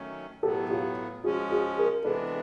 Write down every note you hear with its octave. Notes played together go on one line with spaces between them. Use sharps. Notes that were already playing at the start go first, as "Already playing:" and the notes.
Already playing: D#3 F#3 A3 C#4
A2 F#3 B3 G4 A4
F4 G4
F3 G#3 C#4 F#4 G#4
F#4 G#4
G#4 A#4
C3 E3 G#3 B3 D4 A4 B4